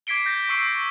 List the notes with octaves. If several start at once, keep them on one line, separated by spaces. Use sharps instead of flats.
D6 G#6 B6 C7 D7 G7
G6 A#6
C#6 E6 C7